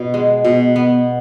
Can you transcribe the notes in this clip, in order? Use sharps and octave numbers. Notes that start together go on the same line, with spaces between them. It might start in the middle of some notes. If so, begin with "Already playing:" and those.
Already playing: B2
G#3
B2
B3